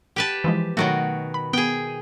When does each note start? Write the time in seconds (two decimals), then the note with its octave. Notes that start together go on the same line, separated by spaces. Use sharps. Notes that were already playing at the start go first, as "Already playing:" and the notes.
0.16 G4 B4 A5
0.44 E3 F3 G#3
0.77 B2 D#3 F#3 A3 F#4
1.34 B5
1.53 B3 G#4 G5